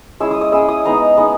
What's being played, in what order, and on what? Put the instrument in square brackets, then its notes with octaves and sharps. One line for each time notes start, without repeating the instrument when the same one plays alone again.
[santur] G#3 C#4 E4 E6
D#6
D#6
G#3 C#4 E4 E6
D#6
G#3 B3 D#4 A#5
G#3 B3 D#4